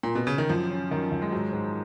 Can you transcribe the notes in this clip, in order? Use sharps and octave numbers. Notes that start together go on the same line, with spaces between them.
A#2
B2
C#3
D#3
F#2 F3
C#4
F#2 D#3
F#2
G#3
G#2 F#3
G#2